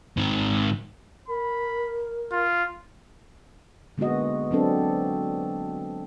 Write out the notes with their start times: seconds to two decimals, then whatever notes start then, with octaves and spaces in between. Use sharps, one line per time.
0.17 G#2 D#3
1.28 A#4 B5
2.32 F4
3.98 D3 G#3 A#3 B3 F#4 D#5
4.51 F#3 C4 D4 A4